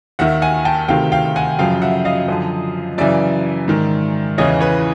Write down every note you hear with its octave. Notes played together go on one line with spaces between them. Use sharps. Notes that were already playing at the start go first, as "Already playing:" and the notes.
D#2 D#3 E5 F#5
F#5 G#5
G5 A5
D2 C3 D#3 F5 G5
F5 G5
F#5 G#5
F#2 C#3 F3 F5 G5
E5 F#5
D#5 F5
F#2 D3 F3
F#2 C#3 E3 D5 E5
G#2 D#3
E2 C#3 E3 C#5 D#5
B4 C#5